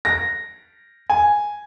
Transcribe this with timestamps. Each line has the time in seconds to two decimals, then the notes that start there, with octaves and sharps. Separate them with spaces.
0.05 A#6
1.10 G#5